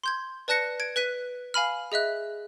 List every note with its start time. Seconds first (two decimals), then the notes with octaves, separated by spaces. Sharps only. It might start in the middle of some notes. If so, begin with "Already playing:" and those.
0.03 C6 G6 G#6
0.48 B4 D5 A5 F#6 A#6 C#7
0.80 G#6 D7
0.96 B4 F#6 B6 D#7
1.54 F5 G#5 B5 F6
1.92 G#4 D#5 E5 F#6